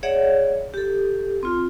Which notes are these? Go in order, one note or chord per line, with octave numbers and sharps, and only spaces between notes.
G#4 C#5 D5 E5 F#5
G4 A4
C4 F4